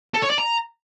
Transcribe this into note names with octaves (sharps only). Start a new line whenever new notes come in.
A4
C#5
D5
A#5